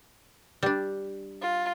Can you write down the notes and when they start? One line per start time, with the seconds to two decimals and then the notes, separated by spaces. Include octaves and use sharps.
0.63 G3 D4
1.40 F4